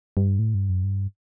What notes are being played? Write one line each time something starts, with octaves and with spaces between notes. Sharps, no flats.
G2
A2
G2
F#2
G2